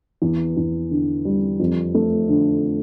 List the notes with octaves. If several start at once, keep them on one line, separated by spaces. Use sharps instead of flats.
E2
E2
D3
G3
F2
A3
D3